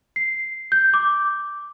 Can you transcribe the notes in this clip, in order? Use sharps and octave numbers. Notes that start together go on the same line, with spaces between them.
C7
G6
D6